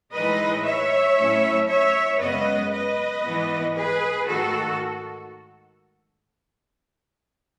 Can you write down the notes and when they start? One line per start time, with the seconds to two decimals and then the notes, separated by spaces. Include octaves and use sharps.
0.13 A2 E3 G#3 D#4 B4 D#5
0.65 C#5 E5
1.17 A2 F#3 A3 C#4 E4
1.68 C#5 E5
2.20 F#2 C#3 G#3 B3 B4 D#5
2.71 B4 D#5
3.23 G#2 E3 B3
3.75 G#4 B4
4.27 G#2 D#3 A3 F#4 A4